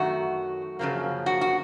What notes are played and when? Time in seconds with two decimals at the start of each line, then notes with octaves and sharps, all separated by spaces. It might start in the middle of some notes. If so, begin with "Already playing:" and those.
Already playing: F#2 D#3 A3 F#4
0.79 F#2 C#3 F3 A#3
1.26 F#4
1.41 F#4